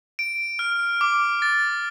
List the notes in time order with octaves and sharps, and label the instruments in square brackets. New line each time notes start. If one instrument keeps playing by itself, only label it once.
[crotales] D7
F6
D6
A6